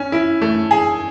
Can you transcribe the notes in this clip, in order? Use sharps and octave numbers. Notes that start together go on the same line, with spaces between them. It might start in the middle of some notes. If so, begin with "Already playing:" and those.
Already playing: C#4
E4
A3
G#4